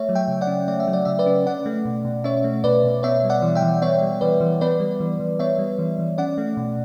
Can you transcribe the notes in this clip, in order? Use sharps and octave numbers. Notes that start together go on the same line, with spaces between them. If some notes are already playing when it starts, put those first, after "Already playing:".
Already playing: A3 C#5 E5
F#3
E5 G5
C#3
D5 F#5
C#4
A3 D5
E5
F#3
D5
C#3 E5
B4 D5
C#4
C#4 D5 F#5
A3
B2
B2
C#4 C#5 E5
A3
B2 B4 D5
B2
B3 C#5 E5
G3
D5 F#5
E3
E5 G5
E3
B3 C#5 E5
G3
E3 B4 D5
E3
B3 B4 D5
G3
E3
E3
B3 C#5 E5
G3
E3
E3
C#4 D5 F#5
A3
B2